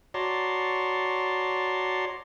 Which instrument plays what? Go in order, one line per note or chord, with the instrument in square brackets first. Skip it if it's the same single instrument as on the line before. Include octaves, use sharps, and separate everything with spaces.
[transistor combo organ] F#4 C#5 D5 A5 A#5 C6